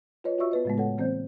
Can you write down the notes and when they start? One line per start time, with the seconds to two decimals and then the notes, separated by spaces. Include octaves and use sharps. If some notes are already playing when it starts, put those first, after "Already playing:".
0.24 F4 B4 C#5 D#5
0.38 F4 F#4 D5 E5 C#6 E6
0.51 B3 B4 D#5
0.65 A2 C#3 G#3 A3 B3
0.78 A4 C#5 F#5
0.98 E3 A#3 C4 C5 D5 G6